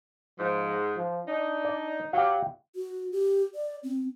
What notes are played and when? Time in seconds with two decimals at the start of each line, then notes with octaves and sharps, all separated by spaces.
0.39 G#2 F3
0.96 F3
1.27 D4 D#4
1.65 D5
2.13 F#3 G4 F5
2.75 F#4
3.12 G4
3.55 D5
3.83 C4